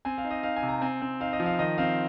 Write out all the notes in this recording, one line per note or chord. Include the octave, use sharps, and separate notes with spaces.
C4 G#5
F5
D#4
D#5
D#4 F5
G#5
C3
A#5
C4 G#5
C4
D#4 F5
D#5
F3
F5
D#3 D#5
C4 F5